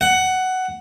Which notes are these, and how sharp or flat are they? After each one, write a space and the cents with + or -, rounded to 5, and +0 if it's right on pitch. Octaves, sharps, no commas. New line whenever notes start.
F#5 +10